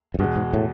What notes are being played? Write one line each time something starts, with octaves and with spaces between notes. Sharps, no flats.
F#2
E2 G2 B2 G#3
G#2
A2